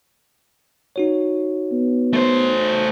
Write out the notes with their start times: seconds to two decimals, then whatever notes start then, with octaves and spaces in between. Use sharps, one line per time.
0.96 D#4 F#4 C#5
1.72 B3
2.13 A3 C5